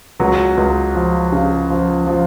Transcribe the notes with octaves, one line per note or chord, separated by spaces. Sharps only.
C#2 F#3
C#2
F3
C#3
F3
F3